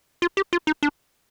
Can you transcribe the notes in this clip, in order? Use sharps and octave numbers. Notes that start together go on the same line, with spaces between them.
F4
G4
F4
D#4
D4